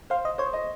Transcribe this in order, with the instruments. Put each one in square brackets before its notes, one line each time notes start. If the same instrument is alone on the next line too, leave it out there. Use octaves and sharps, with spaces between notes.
[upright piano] C5 [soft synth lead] F5
[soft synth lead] D#5
[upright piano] C5 [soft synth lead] C#5
[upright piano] D#5